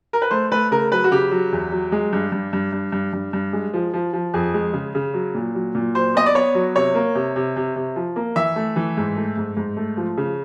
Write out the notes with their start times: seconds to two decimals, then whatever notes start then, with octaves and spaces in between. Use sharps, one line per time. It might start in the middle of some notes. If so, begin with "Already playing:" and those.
0.13 A#4
0.22 B4
0.31 A3 C5
0.52 A3 B4
0.71 C#3 A#4
0.92 F#3 B4
1.04 F#4
1.11 C#3 G4
1.31 F#3
1.52 E2
1.72 F#3
1.92 G#3
2.13 G2
2.32 G2
2.53 G2
2.72 G2
2.92 G2
3.13 G2
3.33 G2
3.53 G#3
3.73 F3
3.93 F3
4.13 F3
4.34 F2 G#4
4.54 G#3
4.73 C#3
4.95 C#3
5.14 F#3
5.34 A#2
5.55 F#3
5.75 A#2
5.95 F#3 C5
6.15 B3 D#5
6.26 D5
6.35 B3 C#5
6.55 F#3
6.76 C3 C#5
6.95 A#3
7.15 C3
7.36 C3
7.56 C3
7.76 C3
7.96 F3
8.16 A#3
8.36 E3 E5
8.56 A3
8.76 E3
8.97 G#2
9.16 A3
9.37 G#2
9.57 G#2
9.77 A3
9.97 F3
10.17 C#3